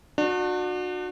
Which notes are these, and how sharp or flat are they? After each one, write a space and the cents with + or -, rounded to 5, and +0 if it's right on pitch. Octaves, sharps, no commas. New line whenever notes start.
D4 +30 F#4 -30